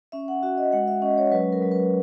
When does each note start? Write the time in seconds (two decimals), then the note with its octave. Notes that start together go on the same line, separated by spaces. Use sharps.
0.12 C#4 E5
0.28 F#5
0.43 F#4 E5
0.58 D#5
0.72 G#3 F#5
0.88 E5
1.02 C#4 D#5
1.18 C#5
1.31 F#3 B4
1.53 A#4
1.62 F#3
1.72 B4